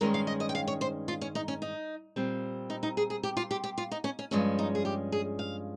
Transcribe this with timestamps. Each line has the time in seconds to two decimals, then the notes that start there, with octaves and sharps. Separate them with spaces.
0.01 G2 D#3 G#3 C#4 A#4
0.14 F5
0.27 D#5
0.40 D#5
0.49 G5
0.55 F5
0.68 C#5
0.81 C5
1.08 F4
1.21 C#4
1.35 D#4
1.48 C#4
1.62 D#4
2.16 A#2 G3 C4
2.70 D#4
2.83 D#4
2.97 G#4
3.10 G#4
3.23 G4
3.37 F4
3.51 G4
3.64 G4
3.78 F4
3.91 D#4
4.04 C#4
4.19 C#4
4.31 G2 F3 G#3 C#4
4.59 D#4
4.75 G#4
4.85 G4
5.12 G#4
5.39 F5